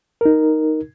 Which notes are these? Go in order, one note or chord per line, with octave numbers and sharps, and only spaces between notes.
D#4 A#4